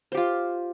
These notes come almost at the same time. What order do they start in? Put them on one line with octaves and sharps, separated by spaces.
C5 G4 F4